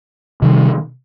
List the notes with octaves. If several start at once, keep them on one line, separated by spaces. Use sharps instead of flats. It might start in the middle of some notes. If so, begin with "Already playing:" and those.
C3 D#3 G3